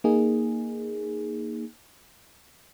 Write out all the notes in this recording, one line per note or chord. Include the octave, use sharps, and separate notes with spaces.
A#3 D#4 G#4